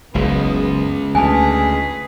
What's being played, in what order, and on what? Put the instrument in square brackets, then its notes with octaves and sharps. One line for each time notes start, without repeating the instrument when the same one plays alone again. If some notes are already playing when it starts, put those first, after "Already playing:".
[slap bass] F#1 C#2 [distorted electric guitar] C#3 G#3 [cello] B3
[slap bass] D2 [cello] G#4 B4 [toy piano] G#5 A5